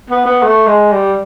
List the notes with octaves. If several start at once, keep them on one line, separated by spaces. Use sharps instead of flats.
B3
B3
A3
G#3
G3